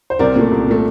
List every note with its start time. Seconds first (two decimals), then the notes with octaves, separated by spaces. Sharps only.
0.10 C5
0.19 C2 A#4 D5
0.36 A#2 A3
0.52 C2
0.68 A#2 A3